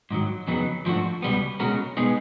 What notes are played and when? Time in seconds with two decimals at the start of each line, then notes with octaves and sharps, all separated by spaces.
0.11 G#2 D#3 F#3
0.47 F2 C#3 F#3 B3 D#4
0.86 G#2 F3 A3 D4 F#4
1.22 C#2 B2 G3 B3
1.60 B2 G#3 C#4 F#4 A#4
1.97 B2 G#3 B3 D#4 G#4